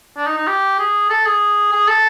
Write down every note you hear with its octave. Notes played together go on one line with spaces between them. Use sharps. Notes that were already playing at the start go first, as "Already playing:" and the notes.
D4
D#4
D#4
G4
G#4
A4
G#4
G#4
A4